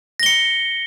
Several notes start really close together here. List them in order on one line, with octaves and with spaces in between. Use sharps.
A#6 G7 C#7